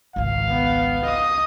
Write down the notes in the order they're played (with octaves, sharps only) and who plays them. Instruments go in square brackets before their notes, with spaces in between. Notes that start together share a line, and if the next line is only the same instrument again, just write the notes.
[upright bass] G#1 C#2 [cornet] F5
[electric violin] B3
D#5 D#6